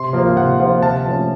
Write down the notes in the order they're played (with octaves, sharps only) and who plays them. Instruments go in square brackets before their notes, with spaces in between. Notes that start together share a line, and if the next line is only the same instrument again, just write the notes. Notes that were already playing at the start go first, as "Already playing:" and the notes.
Already playing: [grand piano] C3 [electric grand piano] C6
[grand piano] F3 A#3 F4 C5
[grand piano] C3 [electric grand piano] F#5
[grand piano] F3 A#3 F4 C5
[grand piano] C3 [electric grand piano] A5
[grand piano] F3 A3 C#4